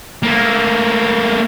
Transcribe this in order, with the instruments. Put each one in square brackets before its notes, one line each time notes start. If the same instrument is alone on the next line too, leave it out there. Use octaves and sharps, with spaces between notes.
[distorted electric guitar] A3 A#3